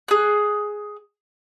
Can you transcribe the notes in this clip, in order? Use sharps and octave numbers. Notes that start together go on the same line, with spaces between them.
G#4 F#6